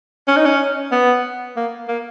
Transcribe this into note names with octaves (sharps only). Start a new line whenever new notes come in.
C#4
D#4
C#4
B3
A#3
A#3